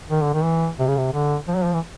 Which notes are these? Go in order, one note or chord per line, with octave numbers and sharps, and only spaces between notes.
D#3
D3
D#3
E3
C3
C#3
C3
D3
F3
F#3
F3
E3